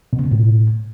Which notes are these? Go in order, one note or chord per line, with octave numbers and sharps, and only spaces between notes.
B2
C#3
B2
A2